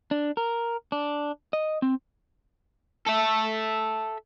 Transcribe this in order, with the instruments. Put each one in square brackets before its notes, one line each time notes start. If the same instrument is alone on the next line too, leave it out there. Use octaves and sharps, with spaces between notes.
[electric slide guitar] D4
A#4
D4
D#5
C4
[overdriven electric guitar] A4 E5